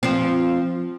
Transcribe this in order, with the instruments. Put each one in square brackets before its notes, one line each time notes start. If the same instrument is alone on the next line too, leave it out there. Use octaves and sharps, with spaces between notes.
[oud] F3 C4